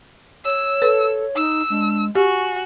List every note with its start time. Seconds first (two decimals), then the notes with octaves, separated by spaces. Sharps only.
0.45 C#5 E6
0.82 A4 B4
1.36 D#4 E6
1.70 G#3 D4
2.15 F#4 G4 G#5 C#6